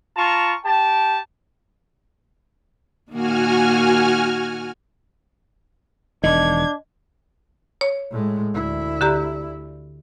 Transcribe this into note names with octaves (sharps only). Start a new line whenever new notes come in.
F4 A5 A#5 C#6
G4 G5 A5
A#2 D#3 A#3 F#4 G#5 F6
E1 D#3 D4 D#5 G#6
C#5
A2 G#3
D2 E4
D3 G4 A#5